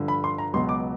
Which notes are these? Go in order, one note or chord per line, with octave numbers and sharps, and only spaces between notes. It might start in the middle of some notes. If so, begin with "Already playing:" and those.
Already playing: G2 D3 F3
B5
C6
A#5
C#2 B2 F#3 C6
D6